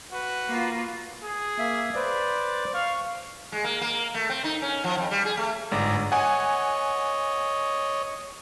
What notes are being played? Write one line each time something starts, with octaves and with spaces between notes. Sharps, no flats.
F#4 B4
A#3 F4
G#4
A#3 E5
B4 C5 D5
F5 C#6
G#3
A#3
A#3
A3
C4
D#4
C#4
F3
F2
G3
G#4
A3
G1 G#2 D5 A#5
C#5 D#5 F#5 G#5